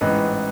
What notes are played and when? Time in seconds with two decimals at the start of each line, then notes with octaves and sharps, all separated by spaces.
0.01 A1 G#2 E3 B4 D#5